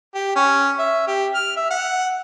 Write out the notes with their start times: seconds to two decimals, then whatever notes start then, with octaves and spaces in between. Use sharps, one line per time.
0.14 G4
0.36 C#4
0.79 E5
1.07 G4
1.34 F6
1.56 E5
1.71 F#5